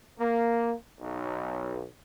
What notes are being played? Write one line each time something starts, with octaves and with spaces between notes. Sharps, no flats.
A#3
B1